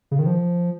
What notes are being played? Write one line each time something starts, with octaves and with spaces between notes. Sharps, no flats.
C#3
D#3
F3